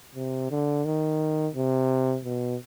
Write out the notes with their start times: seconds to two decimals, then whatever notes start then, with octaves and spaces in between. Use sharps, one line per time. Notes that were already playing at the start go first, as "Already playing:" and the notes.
0.15 C3
0.50 D3
0.85 D#3
1.55 C3
2.25 B2